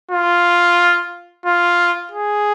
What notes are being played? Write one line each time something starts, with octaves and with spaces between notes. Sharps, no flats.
F4
F4
G#4